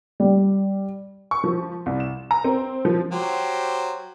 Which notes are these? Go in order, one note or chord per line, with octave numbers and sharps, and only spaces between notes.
G3
C#6
F3
C2
E7
A#5
C4
F3
F#3 G4 C5